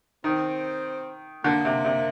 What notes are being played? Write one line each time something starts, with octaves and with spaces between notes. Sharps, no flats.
D#3 C4
D3 A#3
C3
C3